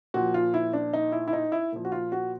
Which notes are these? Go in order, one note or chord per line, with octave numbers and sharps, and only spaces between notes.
A#2 F3 F#4
F4
E4
D4
D#4
E4
E4
D#4
E4
A#2 F3
F#4
F4
F#4